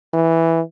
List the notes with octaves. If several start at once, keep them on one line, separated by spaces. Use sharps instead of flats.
E3